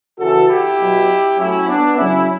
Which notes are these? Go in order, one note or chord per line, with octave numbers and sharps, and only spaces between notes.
C#3 E3 F#4 A4
E4 G4
B2 F#3
A2 F#3 C#4 E4
B3 D4
C#3 F#3 C#4 E4